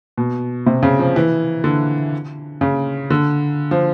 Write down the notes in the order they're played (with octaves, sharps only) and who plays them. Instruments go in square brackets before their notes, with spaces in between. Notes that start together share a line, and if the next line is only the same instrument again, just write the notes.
[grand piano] B2
C3
C#3
F3
E3
D3
C#3
D3
F3